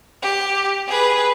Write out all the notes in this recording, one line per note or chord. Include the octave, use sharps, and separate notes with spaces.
G4
G#4 B4